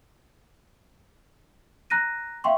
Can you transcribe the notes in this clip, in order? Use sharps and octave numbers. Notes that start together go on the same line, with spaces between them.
A#5 F#6 A#6 D#7
E5 F5 G5 C6 C#6